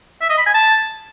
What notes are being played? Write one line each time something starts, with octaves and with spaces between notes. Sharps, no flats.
E5
D#5
B5
G#5
A5